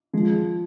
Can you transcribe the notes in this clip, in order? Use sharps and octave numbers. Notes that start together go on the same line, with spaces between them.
F3 G#3